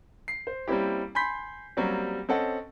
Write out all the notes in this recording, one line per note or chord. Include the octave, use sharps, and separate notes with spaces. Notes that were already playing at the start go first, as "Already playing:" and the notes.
C7
C5
G3 A#3 C4 C#4 E4 G4
G#5 B5 C6 G6 B6
F#3 G3 A#3 C4 C#4 G4
C4 C#4 A4 D#5 F#5